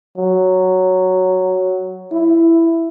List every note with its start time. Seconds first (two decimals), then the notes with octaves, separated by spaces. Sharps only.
0.17 F#3
2.11 E4